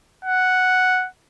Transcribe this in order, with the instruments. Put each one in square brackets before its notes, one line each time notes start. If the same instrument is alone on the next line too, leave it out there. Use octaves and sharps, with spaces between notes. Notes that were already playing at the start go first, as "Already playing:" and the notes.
[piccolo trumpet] F#5